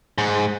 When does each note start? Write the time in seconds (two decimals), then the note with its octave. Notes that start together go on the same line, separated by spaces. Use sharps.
0.18 G#2